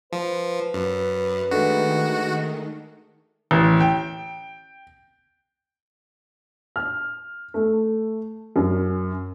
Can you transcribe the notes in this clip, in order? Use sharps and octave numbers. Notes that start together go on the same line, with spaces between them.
F3 B4
F#2
D#3 G#3 A3 D4 F#4
A1
G5
F6
A3
F#2